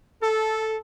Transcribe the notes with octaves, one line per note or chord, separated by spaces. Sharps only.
A4